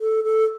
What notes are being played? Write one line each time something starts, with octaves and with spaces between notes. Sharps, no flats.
A4
A4